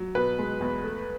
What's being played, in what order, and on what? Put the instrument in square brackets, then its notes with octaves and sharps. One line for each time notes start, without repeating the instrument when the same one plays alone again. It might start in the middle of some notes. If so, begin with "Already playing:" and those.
Already playing: [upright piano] F#3
[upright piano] B2 [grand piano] B4
[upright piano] G#3
E2
A3